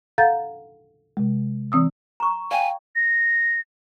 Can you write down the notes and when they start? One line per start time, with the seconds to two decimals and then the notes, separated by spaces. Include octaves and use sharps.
0.18 A4 F5 F#5 A#5 G6 A6
1.17 C3 G#3
1.72 E3 C4 D#6 E6
2.20 A#5 C#6
2.51 D5 F5 G5 G#5
2.96 A#6